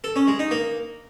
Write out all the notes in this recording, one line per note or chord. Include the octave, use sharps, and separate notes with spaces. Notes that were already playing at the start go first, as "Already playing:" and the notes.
A4
C#4
G#3
D#4
A#3